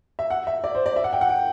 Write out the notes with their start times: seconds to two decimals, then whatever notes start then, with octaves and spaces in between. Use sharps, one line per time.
0.19 E5
0.30 F#5
0.47 E5
0.64 D5
0.75 C5
0.86 D5
0.96 E5
1.04 F#5
1.13 G5
1.21 F#5
1.29 G5